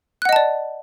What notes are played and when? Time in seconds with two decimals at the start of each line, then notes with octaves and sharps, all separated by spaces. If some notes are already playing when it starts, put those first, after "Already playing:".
0.22 F#6
0.25 F#5
0.29 D#5
0.33 A5
0.36 D5